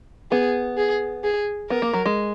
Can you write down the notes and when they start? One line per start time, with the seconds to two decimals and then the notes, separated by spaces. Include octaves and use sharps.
0.31 B3 G#4
0.77 G#4
1.24 G#4
1.70 B3 A#4
1.82 A#3
1.93 F#3
2.06 G#3